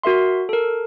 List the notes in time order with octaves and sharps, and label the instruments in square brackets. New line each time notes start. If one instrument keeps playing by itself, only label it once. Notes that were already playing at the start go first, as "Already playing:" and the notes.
[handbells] F#4 A#4 E5 C6
A4 A#4